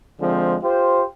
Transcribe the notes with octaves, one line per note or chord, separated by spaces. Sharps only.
D3 F3 G#3 C4
F4 G4 C5